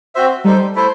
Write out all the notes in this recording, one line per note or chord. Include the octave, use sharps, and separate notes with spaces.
C4 F#4 C5 E5
G3 D#4 A4 C5
A3 E4 A4 C5